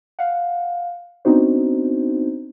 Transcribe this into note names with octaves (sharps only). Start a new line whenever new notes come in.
F5 F#5
B3 C4 D4 D#4 F#4 C5